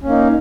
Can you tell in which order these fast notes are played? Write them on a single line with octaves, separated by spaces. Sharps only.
C#4 A#3 D#4